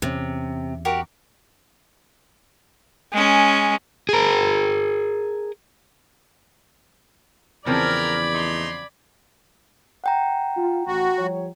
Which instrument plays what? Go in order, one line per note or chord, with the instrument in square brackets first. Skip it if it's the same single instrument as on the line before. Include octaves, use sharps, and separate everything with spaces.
[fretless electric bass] E2 A#3 C#4 [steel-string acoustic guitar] C3
[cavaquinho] F#4 G4 A#4
[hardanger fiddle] G#3 C#4
[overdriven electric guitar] G#4 A#4
[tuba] E2 [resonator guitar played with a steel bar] C#3 F3 C4 [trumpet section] A#4 [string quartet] D5 B5 G#6
[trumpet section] A3 D#4 C6
[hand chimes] F#5 G5 A#5
[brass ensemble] F4
[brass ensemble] A1 [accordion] F#4
[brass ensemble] F3 G3 C#5